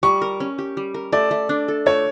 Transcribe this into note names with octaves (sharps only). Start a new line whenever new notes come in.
G3 C#6
A#4
C#4
G4
G3
A#4
A3 D5
A3
D4
A4
A3 C#5